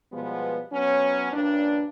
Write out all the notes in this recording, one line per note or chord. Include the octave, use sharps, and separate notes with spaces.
B2 F3 G3 G#3 B3
F#3 B3 C#4
G2 A#2 C#4 D4